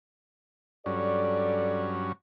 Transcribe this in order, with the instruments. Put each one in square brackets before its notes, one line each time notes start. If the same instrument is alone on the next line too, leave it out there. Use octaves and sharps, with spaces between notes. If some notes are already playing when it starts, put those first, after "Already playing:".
[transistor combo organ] G2 F#3 C#4 [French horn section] A4 D5